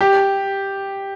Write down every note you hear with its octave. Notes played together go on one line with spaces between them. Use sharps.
G4